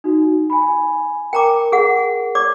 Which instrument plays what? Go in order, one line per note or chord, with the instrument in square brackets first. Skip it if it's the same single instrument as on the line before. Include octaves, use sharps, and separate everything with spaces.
[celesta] D#4 F#4
G#5 B5
[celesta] A#4 [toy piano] G5 A#5 D6
[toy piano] G#4 F#5
D5 D6